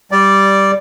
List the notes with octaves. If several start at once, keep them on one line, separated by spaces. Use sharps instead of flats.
G3 D5